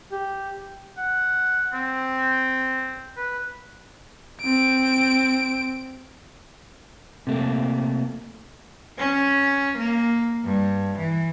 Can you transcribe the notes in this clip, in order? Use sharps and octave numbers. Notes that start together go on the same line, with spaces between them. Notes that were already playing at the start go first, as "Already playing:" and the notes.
G4
F#5
C4
B4
C4 D7
C3 A3 A#3
C#4
A#3
G2
E3